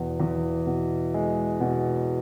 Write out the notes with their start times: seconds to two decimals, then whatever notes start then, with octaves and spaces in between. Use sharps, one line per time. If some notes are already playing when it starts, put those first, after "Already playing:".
Already playing: E2 B2
0.20 E2
0.67 B2
1.14 G#3
1.60 B2